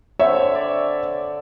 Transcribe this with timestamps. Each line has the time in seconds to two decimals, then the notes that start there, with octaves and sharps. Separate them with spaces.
0.19 D3 C4 C#5 E5
0.55 D5